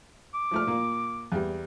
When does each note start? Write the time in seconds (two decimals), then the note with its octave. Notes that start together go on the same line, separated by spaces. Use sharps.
0.34 D6
0.51 F3 A3 F6
0.67 A#2 A#3
1.32 E2 G3